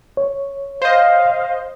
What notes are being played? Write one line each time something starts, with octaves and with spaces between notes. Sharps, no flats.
C#5
C5 D#5 F5